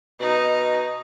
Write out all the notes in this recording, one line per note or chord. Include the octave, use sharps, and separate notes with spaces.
B2 D#4